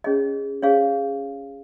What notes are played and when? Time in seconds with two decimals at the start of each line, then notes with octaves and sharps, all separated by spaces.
0.04 C#4 G#4 C#5 D#5
0.62 C#4 G#4 C5 C#5 F5